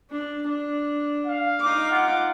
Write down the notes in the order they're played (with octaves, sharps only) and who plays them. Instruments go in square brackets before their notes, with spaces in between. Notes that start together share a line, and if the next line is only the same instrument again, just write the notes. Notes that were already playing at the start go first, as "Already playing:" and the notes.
[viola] D4
D4
[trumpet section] F5
[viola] D#4 D6
[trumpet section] F4 F#5